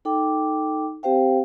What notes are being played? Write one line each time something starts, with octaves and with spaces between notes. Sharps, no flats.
D#4 A4 G5 D6
C4 G4 C5 F5 G5